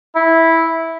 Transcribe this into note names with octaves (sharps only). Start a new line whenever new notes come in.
E4